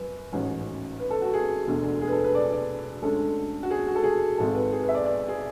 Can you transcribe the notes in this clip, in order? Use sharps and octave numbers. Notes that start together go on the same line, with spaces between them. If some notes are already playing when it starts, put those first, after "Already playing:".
Already playing: F#2 B4
A1 G#2 F#3 C#4
B4
A4
F#4
G#4
E1 D2 D3
G#4
B4
A4
B4
D5
D5
D2 D3 G#3 C#4 A4
F#4
G#4
F#4
A4
G#4
G#1 G#2 G#3 A4
B4
G#4
B4
E5
D5
D5
G#4